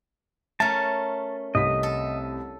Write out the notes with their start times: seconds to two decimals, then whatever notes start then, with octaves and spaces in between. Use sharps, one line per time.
0.60 A3 C#4 A#4 A5
1.55 C2 A3 D#5 B6
1.83 A4